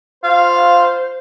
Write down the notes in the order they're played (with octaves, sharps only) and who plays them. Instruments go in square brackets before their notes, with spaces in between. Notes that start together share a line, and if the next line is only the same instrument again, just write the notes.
[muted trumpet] F4 [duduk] C5 [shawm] F5